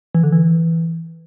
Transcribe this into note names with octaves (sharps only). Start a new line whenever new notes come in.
E3
D3
E3